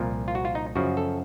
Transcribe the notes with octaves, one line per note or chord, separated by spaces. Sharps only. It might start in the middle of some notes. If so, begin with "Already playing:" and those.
Already playing: C2 A#2 F3
F4
F#4
F4
D#4
F#2 C#3 F3 F#4
A4